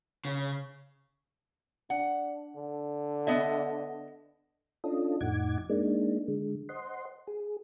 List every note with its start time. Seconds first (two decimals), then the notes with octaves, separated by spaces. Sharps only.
0.25 C#3
1.90 D4 F#5
2.56 D3
3.27 B3 D#5 E5
4.84 C#4 D4 F4 A4 D#5
5.21 F2 A2 D#4 F#5 D6 G#6
5.70 G#3 A#3 D4 D#4
6.28 D3 G#3
6.69 C5 D#5 F#5 C6
7.27 G#4